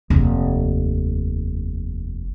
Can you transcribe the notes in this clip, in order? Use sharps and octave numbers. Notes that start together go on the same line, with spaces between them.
F1 D#2